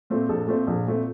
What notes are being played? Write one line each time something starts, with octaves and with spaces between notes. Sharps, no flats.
A#2 A3 C4
A#1 A4
A#2 A3 C4
A#1
A#2 A3 C4